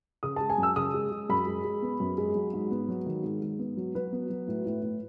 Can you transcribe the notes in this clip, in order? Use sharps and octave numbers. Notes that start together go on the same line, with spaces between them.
C#3 D#6
G#3 A5
G#5
F#2 E6
C#3 D#6
G#3
G#3
F#2 B5
G#3
G#3
B3
F#2
G#3
F#3
G#2
B3
F#3
D#3
G#2
G#2
B3
F#3
F#3 B4
B3
F#3
A2
A2
A2